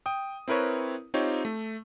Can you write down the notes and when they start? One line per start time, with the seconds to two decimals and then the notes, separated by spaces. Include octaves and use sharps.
0.06 G5 D#6
0.48 C4 E4 A#4 B4 C#5
1.14 C4 D#4 F4 G4 C#5
1.45 A3